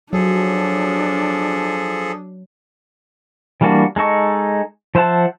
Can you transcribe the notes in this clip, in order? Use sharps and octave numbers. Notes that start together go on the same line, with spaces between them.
F3 F#3 D4 G#4 A4
E3 G3 A#3 D4 F#4
G#3 D#4 A4 C#6
F3 C5 E5 F#5 A5